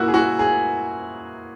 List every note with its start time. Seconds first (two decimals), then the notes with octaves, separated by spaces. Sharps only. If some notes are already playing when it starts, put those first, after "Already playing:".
Already playing: A#2 F#3 A#3 E4 F#4
0.08 G#4
0.14 F#4
0.39 G#4